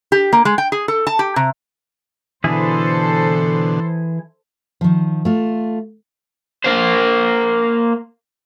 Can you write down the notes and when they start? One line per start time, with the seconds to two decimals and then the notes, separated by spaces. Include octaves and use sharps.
0.12 G4
0.33 A#3
0.45 G#3
0.58 G5
0.72 G#4
0.88 A4
1.07 A5
1.19 G4
1.36 C3
2.44 B2 D3 E3 E4 G#4 A4 C5
4.81 D#3 F3
5.25 A3 F4
6.64 A#3 C5